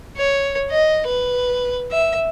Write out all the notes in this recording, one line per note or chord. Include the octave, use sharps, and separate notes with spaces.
C#5
D#5
B4
E5